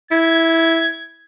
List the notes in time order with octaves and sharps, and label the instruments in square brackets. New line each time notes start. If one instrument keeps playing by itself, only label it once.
[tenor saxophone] E4 [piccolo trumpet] G#6